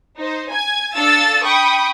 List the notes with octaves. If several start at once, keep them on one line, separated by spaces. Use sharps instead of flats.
D#4 C5
G#5 G#6
D4 A4 F5 E6 A6
G5 B5 C#6 D#6